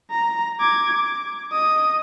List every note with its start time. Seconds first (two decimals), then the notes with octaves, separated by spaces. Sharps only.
0.11 A#5
0.60 D6 G#6
0.93 D6
1.52 D#5 D#6